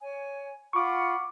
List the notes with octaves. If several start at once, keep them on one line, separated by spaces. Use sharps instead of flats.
C#5 G#5
F4 F#5 B5 C#6 D6